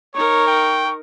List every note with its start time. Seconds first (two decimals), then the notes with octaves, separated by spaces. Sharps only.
0.15 D#4 A#4 C#5 C#6
0.47 G5